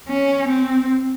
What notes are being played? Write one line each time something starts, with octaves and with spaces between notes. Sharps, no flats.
C#4
C4